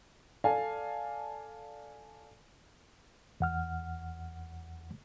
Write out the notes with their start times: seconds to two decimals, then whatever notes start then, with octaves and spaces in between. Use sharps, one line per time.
0.44 A4 D5 F5 G#5 A5
3.40 E2 F#5 F6